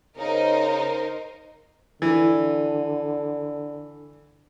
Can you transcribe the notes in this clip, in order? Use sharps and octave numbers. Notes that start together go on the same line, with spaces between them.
C#3 D#4 A#4 C5
D3 E3